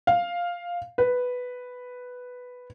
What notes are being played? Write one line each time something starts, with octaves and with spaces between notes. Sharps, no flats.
F5
B4